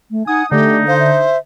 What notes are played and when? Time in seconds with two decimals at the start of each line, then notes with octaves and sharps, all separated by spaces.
0.11 A3
0.27 D#4 F#5 G#5 D#6
0.52 D3 A3 D#4 G4
0.87 C5 F5
0.99 E5